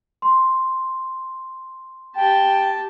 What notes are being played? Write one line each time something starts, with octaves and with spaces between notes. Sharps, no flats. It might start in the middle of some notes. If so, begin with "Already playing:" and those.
C6
G4 G5 A5